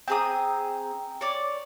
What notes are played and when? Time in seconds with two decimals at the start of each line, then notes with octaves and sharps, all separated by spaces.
0.08 C4 G#4 G5 A#5 D#6
1.21 C#5 D5